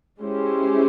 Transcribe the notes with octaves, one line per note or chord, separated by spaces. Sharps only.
G#3 C#4 E4 G4 C5